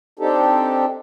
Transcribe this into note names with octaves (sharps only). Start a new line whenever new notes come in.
C4 D4 D#4 G4 A4